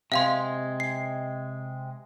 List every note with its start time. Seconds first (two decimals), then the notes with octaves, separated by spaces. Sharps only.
0.12 C3 G#3 E5 F5 C6
0.80 C7